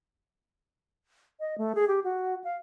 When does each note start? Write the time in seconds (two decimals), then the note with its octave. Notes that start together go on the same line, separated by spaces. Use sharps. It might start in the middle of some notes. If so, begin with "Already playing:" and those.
1.40 D#5
1.58 A3
1.75 G#4
1.88 G4
2.04 F#4
2.44 F5